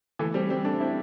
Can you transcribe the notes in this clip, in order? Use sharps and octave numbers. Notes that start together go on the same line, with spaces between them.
E3 A3
G3 C4
G3 C4
A3 D4
C4 E4